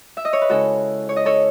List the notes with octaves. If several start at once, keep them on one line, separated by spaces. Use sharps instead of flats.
E5
D#5
C#5
B4
C#3 G#3 C#4 E4 F#4 A4
C#5
D#5
A4 C#5